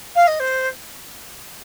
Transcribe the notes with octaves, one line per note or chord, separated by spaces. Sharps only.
F5
D#5
C5